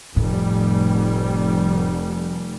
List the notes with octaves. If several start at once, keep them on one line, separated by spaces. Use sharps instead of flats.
F1 A2 G3